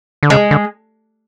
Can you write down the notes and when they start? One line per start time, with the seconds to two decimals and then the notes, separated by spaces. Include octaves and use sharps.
0.23 D3
0.30 C#3 G#3
0.51 D3